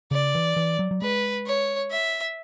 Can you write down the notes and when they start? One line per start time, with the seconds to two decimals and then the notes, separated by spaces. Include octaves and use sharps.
0.11 C#3 D5
0.35 E3
0.57 E3
0.79 F#3
0.91 F#3
1.02 G#3 B4
1.47 C#5
1.91 E5